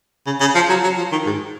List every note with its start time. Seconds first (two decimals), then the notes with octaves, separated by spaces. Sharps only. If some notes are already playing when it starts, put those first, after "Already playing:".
0.26 C#3
0.40 C#3
0.55 F3
0.69 F#3
0.83 F#3
0.97 F3
1.12 D#3
1.26 G#2